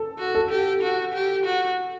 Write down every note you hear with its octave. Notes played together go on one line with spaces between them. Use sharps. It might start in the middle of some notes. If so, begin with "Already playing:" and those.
Already playing: A4
F#4
A4
G4
F#4
G4
F#4